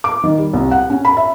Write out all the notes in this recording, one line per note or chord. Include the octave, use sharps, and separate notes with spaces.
D6
D#3
G3
C2
F#5
C#4
B5
E5